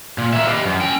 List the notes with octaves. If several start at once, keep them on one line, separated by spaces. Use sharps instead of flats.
A#2
A#2 A#3 E5
G4 B4 D5 D#5 F5
F#2
C#4 G5